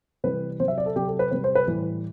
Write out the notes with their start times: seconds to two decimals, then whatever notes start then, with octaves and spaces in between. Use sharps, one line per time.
0.24 C3 E3 G3 B4
0.60 C3 F#3 C5
0.68 E5
0.78 D5
0.86 A4
0.96 C3 F#3 G4
1.08 A4
1.19 B4
1.31 C3 G3 B4
1.44 C5
1.55 B4
1.67 A2 E3 G3